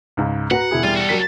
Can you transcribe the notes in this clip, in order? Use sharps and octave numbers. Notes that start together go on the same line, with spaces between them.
C#2 G#2
F#4 B4 F#5 A#5
E1 E4 G#4
G3 F4
F#4 A4
F#3 A#4 B6